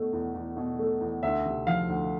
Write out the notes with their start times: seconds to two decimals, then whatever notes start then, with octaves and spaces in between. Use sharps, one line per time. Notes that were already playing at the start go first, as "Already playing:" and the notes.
Already playing: B2 A3
0.13 E2
0.34 E2
0.57 B2
0.79 A3
1.01 E2
1.23 D2 E5
1.46 C3
1.67 F3 F5
1.89 D2